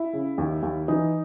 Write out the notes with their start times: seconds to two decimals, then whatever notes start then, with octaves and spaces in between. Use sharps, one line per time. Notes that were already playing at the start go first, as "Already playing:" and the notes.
Already playing: E4
0.13 C#3
0.38 D#2
0.62 D#2
0.88 E3 D#4